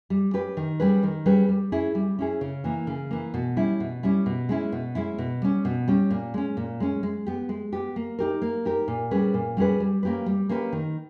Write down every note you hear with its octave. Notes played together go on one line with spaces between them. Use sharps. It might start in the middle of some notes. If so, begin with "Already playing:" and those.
G3
C#4 G4 B4
D#3
G3 C#4 G#4 B4
D#3
G3 C#4 G#4 B4
G3
C#4 E4 G#4
G3
C#4 E4 G#4
C#3
E3 A#3
C#3
E3 A#3
B2
G3 C#4 E4
B2
G3 C#4 E4
B2
G#3 C#4 E4
B2
G#3 C#4 E4
B2
G3 C#4
B2
G3 C#4
A#2
G#3 C#4
A#2
G#3 C#4
G#3
B3 G4
G#3
B3 G4
A#3
D#4 G4 A#4
A#3
D#4 G4 A#4
A#2
G3 C#4 G#4 B4
A#2
G3 C#4 G#4 B4
G3
A#3 C#4 G4 B4
G3
A#3 C#4 G4 B4
D#3